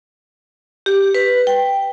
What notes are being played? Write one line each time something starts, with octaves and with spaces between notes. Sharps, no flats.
G4
B4
G5